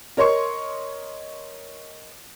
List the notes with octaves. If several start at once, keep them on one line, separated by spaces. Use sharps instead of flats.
A#4 C#5 D#5 C6 C#6